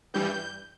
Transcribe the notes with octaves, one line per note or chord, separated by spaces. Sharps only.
G2 E3 G3 G6